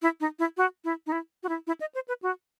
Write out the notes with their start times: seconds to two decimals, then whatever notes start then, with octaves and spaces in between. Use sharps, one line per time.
0.02 E4
0.20 D#4
0.39 E4
0.57 F#4
0.84 E4
1.07 D#4
1.12 E4
1.43 F#4
1.49 E4
1.67 E4
1.81 D#5
1.95 C5
2.08 B4
2.22 F#4